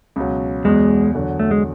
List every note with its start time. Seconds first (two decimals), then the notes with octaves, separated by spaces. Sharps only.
0.16 C#2 B2 F#3
0.65 E2 B2 F#3 G#3 B3
1.14 E2 D3 F#3
1.40 A3
1.51 G#3